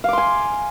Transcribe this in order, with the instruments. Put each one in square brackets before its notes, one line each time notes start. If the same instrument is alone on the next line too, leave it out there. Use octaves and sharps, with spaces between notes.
[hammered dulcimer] F5
D6
C6
G#5